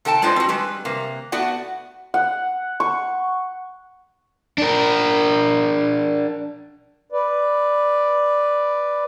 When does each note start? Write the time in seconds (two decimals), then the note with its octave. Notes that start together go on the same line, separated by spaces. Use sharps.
0.05 C3 A4 G5 A5
0.22 G#3 D4 F4 B4 C5 D#5
0.36 C4 F#4
0.49 G3 G#3 B4
0.85 C3 A#3
1.32 A3 B3 F#4 D5 F#5
2.14 F#5
2.80 C#6
4.58 D4 A#4
7.12 B4 D5